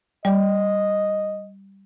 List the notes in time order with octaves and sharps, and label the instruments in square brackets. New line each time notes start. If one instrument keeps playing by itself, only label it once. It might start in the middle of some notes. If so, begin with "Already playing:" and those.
[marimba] G3 D5 G5 [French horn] D#5